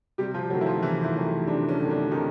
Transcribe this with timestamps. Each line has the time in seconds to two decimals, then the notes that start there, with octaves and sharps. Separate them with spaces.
0.18 C3 G3 G4
0.34 F3 F4
0.50 D#3 F#3 A3 F#4
0.61 E4
0.66 F3 F4
0.82 C3 E3 E4
1.04 E3 E4
1.15 D#3 F#3 A3
1.47 C3 D4
1.69 C#4
1.79 D#3 F#3 A3
1.90 D4
2.11 C3 D#3 D#4